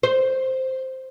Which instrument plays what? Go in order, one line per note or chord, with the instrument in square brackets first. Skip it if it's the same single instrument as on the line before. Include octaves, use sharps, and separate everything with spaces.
[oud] C5